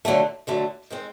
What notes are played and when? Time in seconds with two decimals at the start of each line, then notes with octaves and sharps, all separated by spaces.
0.05 F2 D3 F#3 A3
0.47 F2 D3 F#3 A3
0.91 D#3 G#3 C4